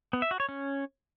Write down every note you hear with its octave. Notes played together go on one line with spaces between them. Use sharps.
B3
E5
F#4
C#5
C#4